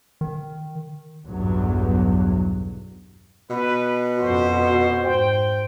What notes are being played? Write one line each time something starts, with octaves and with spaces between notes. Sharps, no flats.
D#3
B1 E2 G2 F#3
B2 B4
F2 C#4 F#4 C5
G#2 C5 G5